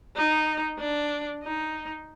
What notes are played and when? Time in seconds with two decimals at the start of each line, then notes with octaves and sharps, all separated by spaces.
0.16 D#4
0.79 D4
1.43 D#4